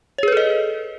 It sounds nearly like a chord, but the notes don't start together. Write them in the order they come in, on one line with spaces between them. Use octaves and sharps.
C#5 G#4 B4 A4 D#5